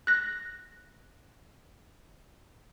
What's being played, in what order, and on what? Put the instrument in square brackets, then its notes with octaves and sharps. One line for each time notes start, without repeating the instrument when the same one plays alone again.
[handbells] F#6 A#6